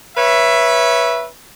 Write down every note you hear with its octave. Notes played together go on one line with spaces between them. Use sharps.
B4 C#5 E5